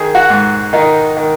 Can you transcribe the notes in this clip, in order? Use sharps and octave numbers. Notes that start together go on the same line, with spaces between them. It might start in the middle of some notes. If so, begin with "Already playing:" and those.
Already playing: D#3 G#4
F#4
G#2
D#3 D#4
D#3